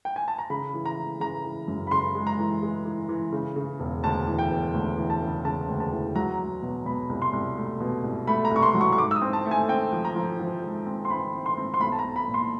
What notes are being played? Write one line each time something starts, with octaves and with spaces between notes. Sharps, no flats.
G5
G#5
A5
A#5
C#3 B5
E3
A#5
E3
C#3 A#5
E3
F#2
B5
C#3 C6
G#3
A#5
E3
G#3
E3
E3
C#3
C#3
E1
D2 A5
E3
G5
E1
D2
E3
A5
C#3
C#3 A5
D2
A5
E3
F#3 A#5
F#3
B2
B2 B5
C2
C6
C2
A3
B2
C2
A3 B5
A#5
C2 C#6
C6
F#3
C#6
C#6
G#2 D6
E6
D#6
C4
A5
A3
G#5
C4 G5
F3
A#5
F3
F3
G#2
C4
C6
C4 B5
C4
C6
C4
C6
B1 B5
A5
A#5
B1
B5
A#2
C6